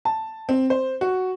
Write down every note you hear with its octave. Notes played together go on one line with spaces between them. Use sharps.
A5
C4
C5
F#4